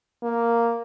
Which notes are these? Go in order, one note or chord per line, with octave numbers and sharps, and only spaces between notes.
A#3